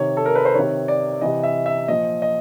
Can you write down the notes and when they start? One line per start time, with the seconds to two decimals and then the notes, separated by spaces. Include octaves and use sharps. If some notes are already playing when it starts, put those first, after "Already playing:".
Already playing: C3 D#3 C#5
0.17 A4
0.26 A#4
0.35 B4
0.45 C5
0.54 C3 D#3 C#5
0.88 D5
1.21 C3 E3 D#5
1.44 E5
1.66 E5
1.88 A#2 F3 D#5
2.22 D#5